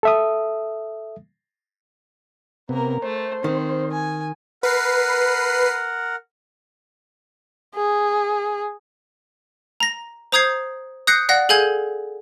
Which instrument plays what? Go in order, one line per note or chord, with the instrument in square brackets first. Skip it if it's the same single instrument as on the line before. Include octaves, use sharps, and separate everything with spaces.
[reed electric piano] A4 E5 D#6
[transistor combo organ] C3 B3 [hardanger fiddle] A#3 A#4
[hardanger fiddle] A3 [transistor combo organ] C5
[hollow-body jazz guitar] D#3 [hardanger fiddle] C4
[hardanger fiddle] G#5
[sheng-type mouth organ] A#4 F#5 [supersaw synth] B4 C7
[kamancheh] G#4
[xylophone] A#5 A#6
C5 A#5 D#6 G6 G#6 C7
D#6 F#6 G6 A#6 C7 C#7
D5 F5 F#5 F#6 A#6
G#4 A4 F5 G#5 G6 G#6